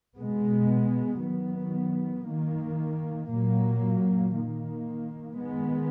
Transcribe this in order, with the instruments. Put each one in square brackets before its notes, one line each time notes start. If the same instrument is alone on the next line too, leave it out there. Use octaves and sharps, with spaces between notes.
[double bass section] B2 G#3 B3
D#3 F#3 B3
D#3 A#3
A#2 F#3 A#3
D#3 A#3
D#3 G#3 B3